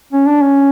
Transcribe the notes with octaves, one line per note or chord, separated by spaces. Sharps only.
C#4
D4
C#4